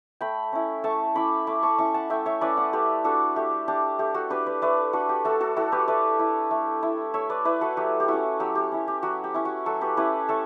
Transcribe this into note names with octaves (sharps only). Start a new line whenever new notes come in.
A3 G5 B5
C#4 E4
A3 A5 C#6
C#4 E4 B5 D6
A3 B5 D6
A5 C#6
C#4 E4 A5 C#6
F#5 A5
A3 E5 G5
C#5 E5
C#4 E4 B4 D5
D5 F#5
A3 G4 B4
D4 F#4 A4
A3 G4
D4 G4
A3 G4
F#4 A4
D4 G4 B4
B4 D5
A3 B4 D5
D4 F#4 A4
G4
A3 F#4 A4
F#4 A4
E4 F#4 A4
G4 B4
A3 B4 D5
E4
A3
E4
A3 C#5 E5
B4 D5
E4 B4 D5
F#4 A4
F#3 G4
G4
C#4 E4 F#4
F#3 G4
G4
C#4 E4
G4
F#3 F#4
G4
C#4 E4
F#4
F#3 F#4 A4
G4 B4
C#4 E4 G4 B4
A3 A4 C#5